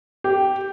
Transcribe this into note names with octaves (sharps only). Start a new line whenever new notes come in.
G4